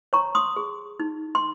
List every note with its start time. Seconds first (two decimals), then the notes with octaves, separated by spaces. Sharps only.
0.13 C#5 A#5 C#6
0.35 C6 D#6
0.56 G#4
1.00 D#4
1.35 C6